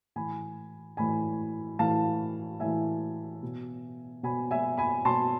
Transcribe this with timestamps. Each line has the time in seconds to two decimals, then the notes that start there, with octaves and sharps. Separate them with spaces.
0.16 A2 E3 G#5 B5
0.97 A2 E3 G#5 B5
1.79 A2 E3 F5 A5
2.60 A2 E3 E5 G#5
3.42 B2
4.23 B2 G#5 B5
4.51 E5 G#5
4.77 G#5 B5
5.05 B2 A5 C6